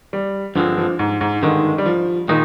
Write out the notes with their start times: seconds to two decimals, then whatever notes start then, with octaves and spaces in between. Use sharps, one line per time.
0.13 G3
0.56 G2 D3 F3 G#3 C4
0.78 F3
0.99 G#2
1.21 G#2
1.43 G2 D3 D#3 G#3
1.78 G3
1.86 F3
2.29 A#2 D#3 G#3 D#4